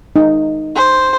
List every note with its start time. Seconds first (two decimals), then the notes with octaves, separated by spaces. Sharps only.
0.16 D#4
0.76 C5